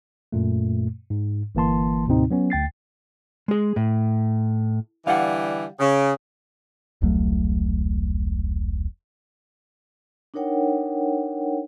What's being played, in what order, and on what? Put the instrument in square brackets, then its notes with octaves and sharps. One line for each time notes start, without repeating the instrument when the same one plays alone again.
[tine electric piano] F#2 A#2 A3
G#2
G1 E3 A#3 A5 C6
D#2 A2 C3 C4 D#4
F#3 B3 C#4
D2 G5 A6 C7
[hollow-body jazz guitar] G#3 G#4
A2
[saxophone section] D3 E3 G3 [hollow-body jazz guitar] F5 F#5
[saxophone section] C#3
[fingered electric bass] E1 C2 F#3 A3
[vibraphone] D4 D#4 A#4 C#5 F#5 G5